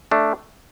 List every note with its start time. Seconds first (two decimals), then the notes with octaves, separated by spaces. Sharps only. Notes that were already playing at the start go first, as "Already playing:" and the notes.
0.11 A3 D4